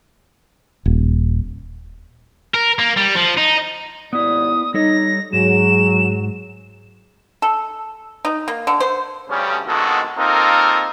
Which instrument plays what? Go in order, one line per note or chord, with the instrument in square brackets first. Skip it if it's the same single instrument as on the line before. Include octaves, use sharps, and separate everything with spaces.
[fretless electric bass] D#1
[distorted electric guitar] A#4
A#3
G3
F3
D#4
[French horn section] D#2 G#2 D5 [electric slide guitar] B3 E4 [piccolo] D#6
[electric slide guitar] G3 A4 C#5 [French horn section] D#4 [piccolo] A#6
[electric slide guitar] G#2 [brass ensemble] F#3 [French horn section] G#4 [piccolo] E7
[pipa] A4
D#4
A#3
D3
C5
[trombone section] D2 G2 C#3 G3 C#4
A#1 B2 D#3 G#3 F#4 A4
A#3 C4 D#4 F4 A4 A#4